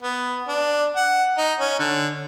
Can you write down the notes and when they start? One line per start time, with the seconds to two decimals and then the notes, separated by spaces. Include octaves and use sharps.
0.03 B3
0.48 D4
0.96 F#5
1.38 D#4
1.60 C#4
1.79 D3